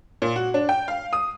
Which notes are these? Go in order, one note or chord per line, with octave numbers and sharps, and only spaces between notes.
A#2
F#4
D4
G5
F5
D#6